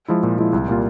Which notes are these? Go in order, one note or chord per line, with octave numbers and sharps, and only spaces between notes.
F3 G#3 E4
A#2
F3 G#3 E4
C2
A#2 G3 A#3 F4